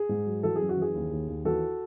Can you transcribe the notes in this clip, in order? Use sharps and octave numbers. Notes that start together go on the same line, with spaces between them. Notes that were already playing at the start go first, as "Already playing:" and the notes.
Already playing: G#4
G#2
F#3
E3 F#4 A4
F#2 G#4
F#4
E3 G#4
D#2
D#2
D#2
E3 F#4 A4